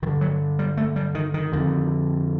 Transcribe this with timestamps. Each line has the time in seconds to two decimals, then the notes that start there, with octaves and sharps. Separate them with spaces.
0.02 G2 D#3
0.07 D3
0.21 F#3
0.59 G3
0.77 A3
0.96 G3
1.15 D#3
1.34 D#3
1.52 F2 D3